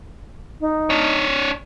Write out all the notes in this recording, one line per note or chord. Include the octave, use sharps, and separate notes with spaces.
D#4
D4 C#5